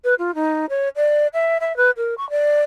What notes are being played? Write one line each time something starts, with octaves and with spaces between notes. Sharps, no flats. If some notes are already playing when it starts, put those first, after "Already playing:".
B4
F4
D#4
C#5
D5
E5
E5
B4
A#4
C#6
D5